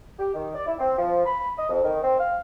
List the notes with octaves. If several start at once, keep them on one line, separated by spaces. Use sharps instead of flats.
G4
D#3
D5
E4
C4
F3
B5
D#5
F2
D#3
C4
F5